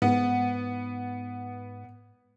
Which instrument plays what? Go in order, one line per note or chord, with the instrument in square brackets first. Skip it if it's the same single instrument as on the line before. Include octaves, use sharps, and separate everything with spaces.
[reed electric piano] G#2 [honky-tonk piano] B3